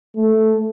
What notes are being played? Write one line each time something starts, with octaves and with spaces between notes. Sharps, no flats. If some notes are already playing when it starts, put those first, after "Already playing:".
A3